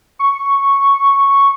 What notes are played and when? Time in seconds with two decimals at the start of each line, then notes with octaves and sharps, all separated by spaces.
0.19 C#6